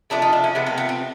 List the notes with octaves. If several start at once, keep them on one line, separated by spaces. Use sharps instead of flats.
C3 F3 A3 D4
D#4
D4
C#4
C3 F3 A3 B3
A#3
B3
C4